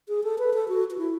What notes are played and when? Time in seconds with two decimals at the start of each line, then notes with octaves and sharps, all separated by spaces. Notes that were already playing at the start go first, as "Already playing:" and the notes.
0.09 G#4
0.24 A4
0.38 B4
0.54 A4
0.68 F#4
0.91 F#4
0.98 E4